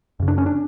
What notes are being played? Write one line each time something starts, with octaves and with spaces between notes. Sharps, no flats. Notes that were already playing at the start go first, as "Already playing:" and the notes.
F#2 C#3
D4
C#4
D4